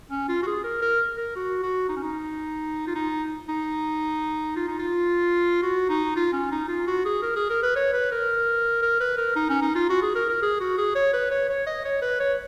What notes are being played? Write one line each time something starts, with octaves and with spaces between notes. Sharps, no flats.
C#4
F4
F#4
G#4
A#4
A#4
A#4
F#4
F#4
D#4
C#4
D#4
F4
D#4
D#4
F4
D#4
F4
F#4
D#4
F4
C#4
D#4
F4
F#4
G#4
A#4
G#4
A#4
B4
C#5
B4
A#4
A#4
B4
A#4
D#4
C#4
D#4
F4
F#4
G#4
A#4
A#4
G#4
F#4
G#4
C#5
B4
C#5
C#5
D#5
C#5
B4
C#5